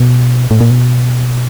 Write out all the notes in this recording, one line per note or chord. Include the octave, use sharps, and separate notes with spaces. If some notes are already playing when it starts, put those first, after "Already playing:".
Already playing: B2
A2
A#2
B2